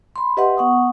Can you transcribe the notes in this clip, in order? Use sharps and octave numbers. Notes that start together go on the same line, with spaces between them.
B5 C6
G4 B4 D#5 E5 F#5 C6
B3 F#5 C#6 D#6